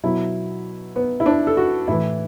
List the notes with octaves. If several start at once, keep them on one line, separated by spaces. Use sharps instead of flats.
B2 F#3 E4
B3
E4
D4
A4
F#4
A2 E3 E4